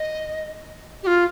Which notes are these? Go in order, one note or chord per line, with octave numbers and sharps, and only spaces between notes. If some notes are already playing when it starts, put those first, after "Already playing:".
Already playing: D#5
G4
F4